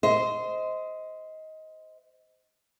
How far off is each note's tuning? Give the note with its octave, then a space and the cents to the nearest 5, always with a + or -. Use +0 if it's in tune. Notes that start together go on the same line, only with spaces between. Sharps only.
C5 -15 D#5 +20